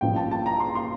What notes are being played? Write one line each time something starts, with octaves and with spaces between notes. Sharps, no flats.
A1 G2 F3 G5
A5
A5
A#5
C6
C6